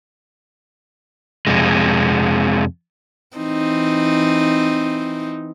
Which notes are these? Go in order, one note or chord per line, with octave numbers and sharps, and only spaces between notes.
F2 C3 G#3
E3 C4 D#4